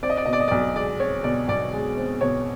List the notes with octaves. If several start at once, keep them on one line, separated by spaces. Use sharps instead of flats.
C4 D5
D#5
D5
B2 D#5
D5
D#5
B1 D5
G#3 D5
C4 C#5
B2 D5
B1 D5
G#3
C4
B2 C#5